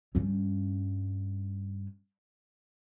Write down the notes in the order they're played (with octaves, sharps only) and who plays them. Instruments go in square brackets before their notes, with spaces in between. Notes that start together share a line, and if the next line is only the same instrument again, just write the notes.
[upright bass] G2 C#4